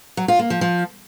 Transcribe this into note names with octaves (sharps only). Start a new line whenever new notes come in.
F#3
F4
A#3
F3
F3